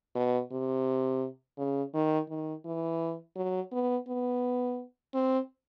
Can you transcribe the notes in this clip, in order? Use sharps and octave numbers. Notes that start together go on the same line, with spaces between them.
B2
C3
C#3
D#3
D#3
E3
F#3
B3
B3
C4